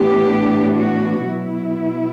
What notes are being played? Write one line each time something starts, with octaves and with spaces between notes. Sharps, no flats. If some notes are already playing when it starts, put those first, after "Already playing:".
Already playing: A2 E3 B3 D4 G4
F#4
B2 F#3 B3 E4